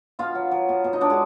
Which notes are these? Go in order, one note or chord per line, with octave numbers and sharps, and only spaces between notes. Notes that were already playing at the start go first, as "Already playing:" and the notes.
B2 F4 F5
F#3
F#3
B2
B2
D#4 D#5
F#3 D4 D5
G#3 G#4